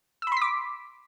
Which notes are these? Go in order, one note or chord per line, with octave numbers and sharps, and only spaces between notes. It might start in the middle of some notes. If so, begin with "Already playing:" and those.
B5 C6 D6 E6 B6